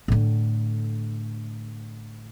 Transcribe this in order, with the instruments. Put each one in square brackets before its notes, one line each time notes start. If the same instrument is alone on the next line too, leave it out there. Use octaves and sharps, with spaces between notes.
[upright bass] A2 D3